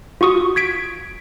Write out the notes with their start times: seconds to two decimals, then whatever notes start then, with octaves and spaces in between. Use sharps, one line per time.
0.21 F4 F#4 C#6 D#6
0.56 G#6 B6 D7